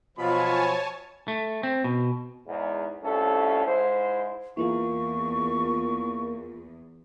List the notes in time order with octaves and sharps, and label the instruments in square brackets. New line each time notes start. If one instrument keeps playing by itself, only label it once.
[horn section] B2 B5 [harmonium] F3 F#3 [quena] F4 [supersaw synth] C#5 G#5 A5
[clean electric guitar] A3
C4
B2
[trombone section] E2 G#2
C2 A3 C#4 F4 A4
G#2 E4 C5
[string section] E2 [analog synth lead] A#3 [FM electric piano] E4 F4 G#4 [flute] C#6